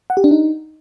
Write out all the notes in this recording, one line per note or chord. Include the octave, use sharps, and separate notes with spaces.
F#5
G4
D4
D#4